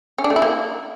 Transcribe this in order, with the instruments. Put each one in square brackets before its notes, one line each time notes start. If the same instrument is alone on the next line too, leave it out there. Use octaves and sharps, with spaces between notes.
[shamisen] C#4
D4
A3
E4
A#3